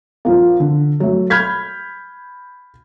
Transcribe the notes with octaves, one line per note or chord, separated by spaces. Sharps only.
A#1 F3 A#3
D3
F#3 A3
B5 F6 G6 G#6 B6